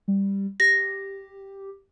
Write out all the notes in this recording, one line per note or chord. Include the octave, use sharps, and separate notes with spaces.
G3
G4 A#6